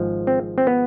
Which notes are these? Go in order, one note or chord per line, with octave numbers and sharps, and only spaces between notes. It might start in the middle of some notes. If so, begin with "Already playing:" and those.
Already playing: G#1 G#2 F3 G#3
C4
C4
B3